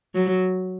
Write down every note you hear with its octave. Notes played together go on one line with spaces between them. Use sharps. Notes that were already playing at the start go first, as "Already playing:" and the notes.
F#3